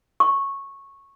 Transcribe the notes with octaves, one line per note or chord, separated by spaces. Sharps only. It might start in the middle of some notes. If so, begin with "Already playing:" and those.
C#6